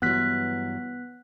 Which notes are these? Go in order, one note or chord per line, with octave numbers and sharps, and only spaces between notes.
G2 E3 F#3 B3 F#6 B6